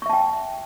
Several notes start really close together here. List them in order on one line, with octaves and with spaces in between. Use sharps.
C#6 E5 A5 G5